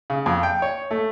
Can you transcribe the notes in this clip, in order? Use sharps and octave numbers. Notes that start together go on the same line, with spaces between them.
C#3
F2
G5
C#5
A3